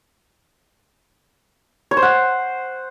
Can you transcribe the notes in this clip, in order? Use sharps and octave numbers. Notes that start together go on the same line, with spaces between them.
C#5
C5
F#5